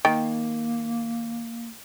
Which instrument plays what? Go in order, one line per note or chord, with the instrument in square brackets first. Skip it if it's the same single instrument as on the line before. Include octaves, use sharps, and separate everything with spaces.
[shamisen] D#3 [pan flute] A#3 [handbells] G5